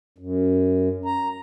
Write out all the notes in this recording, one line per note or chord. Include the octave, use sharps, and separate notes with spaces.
F#2
A#5